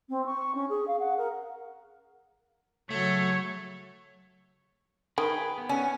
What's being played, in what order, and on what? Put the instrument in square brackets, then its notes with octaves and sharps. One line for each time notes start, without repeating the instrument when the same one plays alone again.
[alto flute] C4
C#6
C#4
G#4
F5
F#5
A#4
[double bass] C#3 F#3 [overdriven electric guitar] A3 [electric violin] C#5
[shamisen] D#3 [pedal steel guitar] G#4 B4 G5
[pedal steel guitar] B3
[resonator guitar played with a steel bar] C#4